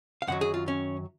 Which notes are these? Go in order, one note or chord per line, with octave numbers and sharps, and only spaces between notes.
F5
F#2 D#3 F#3 F#5
G#4
F4
C#4